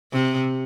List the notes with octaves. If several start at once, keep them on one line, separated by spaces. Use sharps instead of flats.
C3